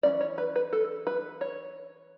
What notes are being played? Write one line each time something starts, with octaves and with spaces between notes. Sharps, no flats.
E3 A3 C#4 D5
C#5
B4
B4
A4
B4
C#5